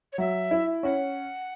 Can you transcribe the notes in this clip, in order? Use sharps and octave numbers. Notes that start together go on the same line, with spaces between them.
C#5
F#3 E5
E4
C#4 F#5